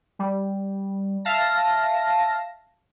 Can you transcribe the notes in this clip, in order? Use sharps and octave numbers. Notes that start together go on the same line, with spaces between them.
G3
E5 F5 A5 A#6